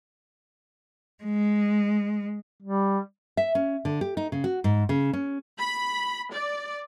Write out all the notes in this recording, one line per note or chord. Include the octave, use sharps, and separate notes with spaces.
G#3
G3
E5
C#4
D3
G4
D#4
C#3
F#4
G#2
C#3
C#4
B5
D5